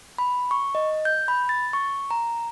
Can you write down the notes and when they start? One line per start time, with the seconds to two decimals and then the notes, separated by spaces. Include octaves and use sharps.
0.18 B5
0.51 C#6
0.75 D#5
1.05 G6
1.28 B5
1.49 A6
1.73 C#6
2.11 A#5